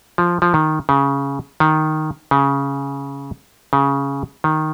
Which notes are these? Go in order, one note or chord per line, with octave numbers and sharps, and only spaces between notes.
F3
F3
D#3
C#3
D#3
C#3
C#3
D#3